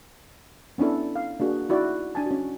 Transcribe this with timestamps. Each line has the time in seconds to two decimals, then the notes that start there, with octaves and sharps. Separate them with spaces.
0.78 B3 C#4 D4 E4 A4
1.15 F5
1.40 A#3 D4 F#4 G#4
1.69 D#4 E4 F#4 D5
2.15 D4 G#5 A5
2.26 C#4 F#4